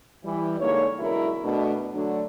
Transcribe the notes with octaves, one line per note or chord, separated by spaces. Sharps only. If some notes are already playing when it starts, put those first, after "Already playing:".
E3 G3
D3 G#3 A#3 D#4 C#5
F#2 B2 D3 G#3 E4 A#4
B2 A3 D4
D3 F#3 A3 D4